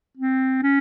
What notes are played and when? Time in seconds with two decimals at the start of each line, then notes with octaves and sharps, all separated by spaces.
0.17 C4
0.63 C#4